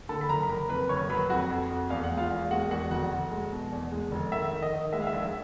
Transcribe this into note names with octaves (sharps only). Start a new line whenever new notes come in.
D3 A4 A5
B5
F#1 A#4 A#5
B5
F#1 A#4 A#5
F2 B4 B5
F#1 C#5 C#6
F#3 B4 B5
F2 F#4 F#5
F2
F2
E2 F5
F#5
G#3
F4 F5
E2
G#3 F#4 F#5
E2 F#4 F#5
F1 F#4 F#5
F1
G#3
B2
E2
G#3
F1
D#3 E5
D#3
D#5
D#3
G#3 E5
F5
E5
A#1
E5